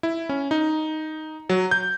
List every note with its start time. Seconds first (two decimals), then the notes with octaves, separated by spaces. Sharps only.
0.03 E4
0.29 C#4
0.51 D#4
1.50 F#3
1.71 G6